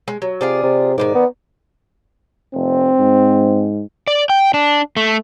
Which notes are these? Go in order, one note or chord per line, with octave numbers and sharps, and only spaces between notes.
G#3
F#3
C3 F4 G#4 D5
C3
G#2 D#3 F3 D5
B3
F1 C4
G#2
D5
G5
D4
A3